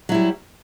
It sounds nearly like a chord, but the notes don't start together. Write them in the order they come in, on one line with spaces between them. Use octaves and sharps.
F#3 E4 G3